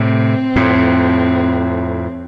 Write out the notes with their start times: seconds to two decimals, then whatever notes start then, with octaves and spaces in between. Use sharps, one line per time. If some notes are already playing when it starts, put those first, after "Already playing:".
Already playing: A2 C3 C4
0.56 F2 A2